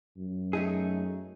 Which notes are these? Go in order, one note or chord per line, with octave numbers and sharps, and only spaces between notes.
F#2
A3 D#4 G#4